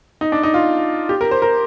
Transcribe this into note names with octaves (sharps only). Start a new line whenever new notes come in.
D#4
D4
D#4
F4
G4
A#4
C5
A#4